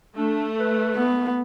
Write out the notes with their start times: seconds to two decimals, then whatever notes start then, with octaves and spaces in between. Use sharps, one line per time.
0.18 A3 D4
0.60 B4
0.96 B3